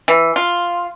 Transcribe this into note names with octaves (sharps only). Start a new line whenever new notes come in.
E3
F4